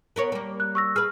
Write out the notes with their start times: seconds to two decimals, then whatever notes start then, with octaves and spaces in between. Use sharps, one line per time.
0.16 B3 A#4 C#5
0.32 G3 A#3
0.60 F#6
0.75 C#6 E6 A#6
0.96 G#4 B4 F6